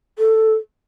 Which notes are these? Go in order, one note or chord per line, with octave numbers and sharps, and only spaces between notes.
A4